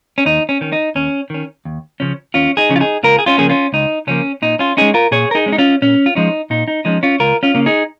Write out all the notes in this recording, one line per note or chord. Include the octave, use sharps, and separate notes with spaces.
C#4
D#2 D#4
C#4
D#3 C#4
D#4
D#2 C#4
D#3 C#4
D#2
C#3 F3 C#4
D#2 C#4 F4
D#4 G#4
C#3 F3 C#4
F4
D#4 G#4
C#2 F4 A#4
G#4
C#4 F4
C#3 F3 A#3 G#4
C#4 F4
C#2 D#4
C#3 F3 A#3 C#4
A#2 D#4
C#4 F4
G#3 C#4 D#4 G#4
F4 A#4
A#2 G#4 C#5
A#4
D#4 G#4
G#3 C#4
D#4
C#4 F4
A#2 C#4
F4
F3 G#3 C#4 D#4
A#2 D#4
D#4
F3 G#3 C#4 D#4
C#4 F4
C#2 F4 A#4
C#4 F4
C#3 A#3 C#4
D#4 G#4